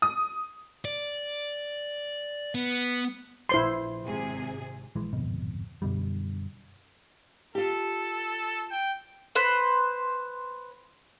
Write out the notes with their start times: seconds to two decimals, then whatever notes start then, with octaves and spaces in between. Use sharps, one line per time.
0.02 D#6
0.85 D5
2.55 B3
3.49 A#1 E4 C5 C6
4.02 G#1 C3 G#4
4.96 A#1 E3 G#3
5.13 D1 G#1 F2 B2
5.82 F#2 B2 D3 G3
7.55 F4 G4 A4
8.71 G5
9.35 B4 C5